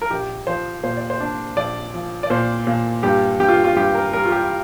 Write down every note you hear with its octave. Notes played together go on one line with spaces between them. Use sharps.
A#4
A#1 G4
F3 C5
A#2 C5
D5
C5
D4
A#1 D5
F3
D5
A#2 C5
A#2
G2 G4
G2 G4
F4
F4
G2 G4
A#4
G3 A#4
F4
G4